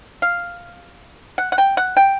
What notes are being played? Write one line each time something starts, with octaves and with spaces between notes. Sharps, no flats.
F5
F#5
F#5
G5
F#5
G5